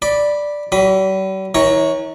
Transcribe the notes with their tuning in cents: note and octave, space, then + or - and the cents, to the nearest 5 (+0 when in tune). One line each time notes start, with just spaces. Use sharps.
D5 +0 B5 -10
G3 -45 B5 +5
E3 -45 C#5 +0 A#5 +0